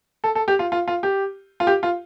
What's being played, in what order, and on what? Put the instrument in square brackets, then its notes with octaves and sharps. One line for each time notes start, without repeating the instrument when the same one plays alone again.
[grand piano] A4
A4
G4
F4
F4
F4
G4
F4
G4
F4